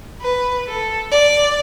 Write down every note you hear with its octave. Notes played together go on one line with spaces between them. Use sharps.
B4
A4
D5